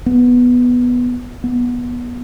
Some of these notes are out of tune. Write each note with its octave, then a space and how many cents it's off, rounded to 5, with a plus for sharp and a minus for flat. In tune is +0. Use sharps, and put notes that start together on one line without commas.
B3 -5
B3 -20